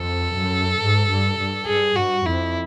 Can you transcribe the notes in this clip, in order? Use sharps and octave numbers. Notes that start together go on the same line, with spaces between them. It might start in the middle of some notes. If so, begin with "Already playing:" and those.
Already playing: F2 A4
F#2
G#2
G2
G2
G2 G#4
G2 F#4
F2 E4